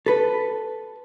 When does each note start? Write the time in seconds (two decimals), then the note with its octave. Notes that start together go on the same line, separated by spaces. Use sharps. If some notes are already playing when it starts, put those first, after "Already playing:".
0.06 A4 B4